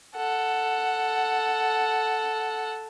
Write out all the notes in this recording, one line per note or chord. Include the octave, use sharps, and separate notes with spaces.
A4 F#5